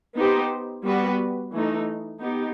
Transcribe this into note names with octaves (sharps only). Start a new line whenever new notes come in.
B3 D#4 G4 C5
G3 B3 F#4 B4
E3 A3 D#4
B3 D#4 G4